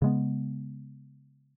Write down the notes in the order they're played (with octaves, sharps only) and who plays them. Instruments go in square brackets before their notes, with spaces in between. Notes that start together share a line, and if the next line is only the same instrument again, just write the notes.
[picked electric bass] C#3 G#3 B3